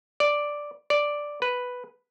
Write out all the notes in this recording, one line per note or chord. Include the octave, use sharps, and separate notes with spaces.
D5
D5
B4